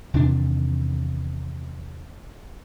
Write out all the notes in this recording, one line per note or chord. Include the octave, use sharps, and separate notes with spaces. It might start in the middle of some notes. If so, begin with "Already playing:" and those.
E2 C3 D#3 D4